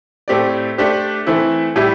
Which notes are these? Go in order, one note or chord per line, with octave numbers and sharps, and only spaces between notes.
A2 A3 C4 G4 D5
A3 D4 G4 C5
E3 A3 C4 E4
A2 G3 E4 G4